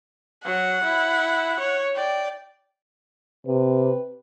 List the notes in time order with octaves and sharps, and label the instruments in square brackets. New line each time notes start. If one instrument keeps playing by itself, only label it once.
[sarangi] F#3 [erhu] F#5
[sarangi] E4
C#5
[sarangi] D5 [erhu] G5
[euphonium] C3 [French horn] B4